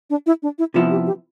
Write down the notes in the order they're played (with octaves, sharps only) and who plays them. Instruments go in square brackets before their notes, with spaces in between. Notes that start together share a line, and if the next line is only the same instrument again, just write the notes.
[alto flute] D4
E4
D4
E4
[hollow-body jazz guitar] C3 F3 B3 E4 [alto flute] F4
[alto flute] G4
G4